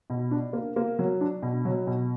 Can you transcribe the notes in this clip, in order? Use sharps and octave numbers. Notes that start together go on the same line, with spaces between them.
B2
D4
A#3
A#3
F#3
D4
B2
F#3
B2